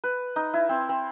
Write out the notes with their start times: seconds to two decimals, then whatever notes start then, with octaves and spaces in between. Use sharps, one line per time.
0.04 B4
0.36 D#4
0.54 E4
0.69 C4
0.89 C4